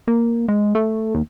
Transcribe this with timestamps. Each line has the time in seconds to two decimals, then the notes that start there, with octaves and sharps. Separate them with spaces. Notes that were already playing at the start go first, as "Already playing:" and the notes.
0.07 A#3
0.48 G#3
0.75 A3
1.15 D#2